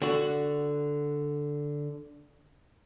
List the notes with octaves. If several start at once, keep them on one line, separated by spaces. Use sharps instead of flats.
D3 F#4